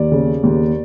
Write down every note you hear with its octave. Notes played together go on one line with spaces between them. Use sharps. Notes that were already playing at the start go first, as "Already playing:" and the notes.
Already playing: D#2 D5
C#3
D#2